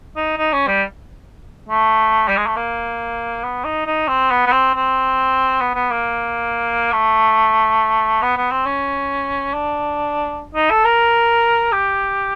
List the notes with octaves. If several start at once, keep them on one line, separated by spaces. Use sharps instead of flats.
D#4
D#4
C#4
G3
A3
G3
G#3
A3
A#3
B3
D#4
D#4
C4
B3
B3
C4
C4
B3
B3
A#3
A3
B3
B3
C4
C#4
D4
D#4
A4
A#4
G4